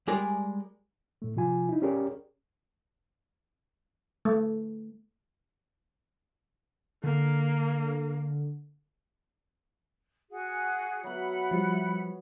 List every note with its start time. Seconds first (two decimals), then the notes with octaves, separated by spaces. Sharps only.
0.07 G3 G#3 G#4 A#4 D5
1.22 A2 A3
1.36 C3 F3 F4 G#5
1.69 D#4 E4
1.82 C#4 G4 G#4 A#4 C#5 D5
4.25 A3
7.04 D3 A#3
10.31 F#4 G#4 F#5
11.04 F#3 B3 E5 F#5 B5
11.51 F3 G3